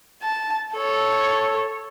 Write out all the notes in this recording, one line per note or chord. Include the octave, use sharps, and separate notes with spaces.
A5
A4 C#5